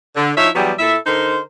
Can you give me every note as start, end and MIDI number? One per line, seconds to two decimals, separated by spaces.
0.17 0.32 50
0.37 0.49 53
0.37 0.49 63
0.37 0.49 64
0.37 0.49 73
0.37 0.49 76
0.56 0.73 52
0.56 0.73 54
0.56 0.73 55
0.56 0.73 59
0.56 0.73 67
0.56 0.73 68
0.79 0.96 46
0.79 0.96 64
0.79 0.96 69
0.79 0.96 76
1.06 1.39 50
1.06 1.39 63
1.06 1.39 70
1.06 1.39 72